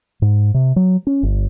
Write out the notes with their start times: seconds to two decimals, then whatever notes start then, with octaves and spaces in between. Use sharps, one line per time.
0.22 G#2
0.54 C3
0.76 F#3
1.07 C#4
1.23 G1